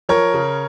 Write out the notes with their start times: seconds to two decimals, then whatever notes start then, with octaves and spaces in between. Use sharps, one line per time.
0.09 F3 A#4 C#5
0.34 C#3